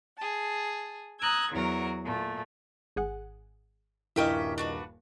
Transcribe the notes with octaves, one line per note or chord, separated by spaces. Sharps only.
G#4 A5
A#5 D#6 E6 F#6 G#6
E2 F#3 F#4 A#4
A#2 A3
G#1 G#4 F#5
D#1 G2 C#4 E4 G4 A#4 D#5 E5
D4 F#4 B4